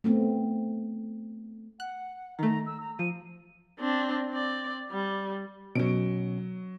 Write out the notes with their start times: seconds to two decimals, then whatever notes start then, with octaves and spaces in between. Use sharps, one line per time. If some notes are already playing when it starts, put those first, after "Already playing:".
0.04 A3 B3 C4
1.80 F#5 F#6
2.39 D#3 A3 A#5
2.66 E6
2.80 A#5
2.99 F3 D#7
3.79 C4 D4
4.29 C4 D5
4.91 G3
5.75 B2 F#3 C#4 D7